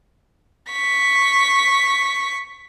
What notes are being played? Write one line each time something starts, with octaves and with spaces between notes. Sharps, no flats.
C#6 B6